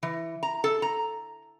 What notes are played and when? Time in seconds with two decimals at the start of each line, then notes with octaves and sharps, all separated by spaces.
0.03 E3
0.43 A#5
0.64 A4
0.82 A#5